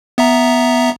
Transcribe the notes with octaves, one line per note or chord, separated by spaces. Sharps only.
B3 E5 A#5